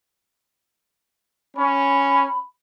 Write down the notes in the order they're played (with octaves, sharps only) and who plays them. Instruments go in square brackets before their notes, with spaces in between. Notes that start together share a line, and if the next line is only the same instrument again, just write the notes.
[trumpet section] C#4 [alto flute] B5